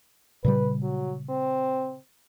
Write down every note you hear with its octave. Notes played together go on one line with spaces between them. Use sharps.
A#2 C#3 G3 B4
F#3
C4